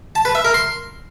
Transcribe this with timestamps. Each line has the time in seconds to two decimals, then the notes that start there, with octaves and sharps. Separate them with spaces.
0.15 A5
0.25 B4
0.35 E5
0.45 A#4
0.54 C6